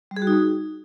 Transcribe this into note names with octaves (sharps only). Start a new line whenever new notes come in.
G3
G#4
F#4
D#4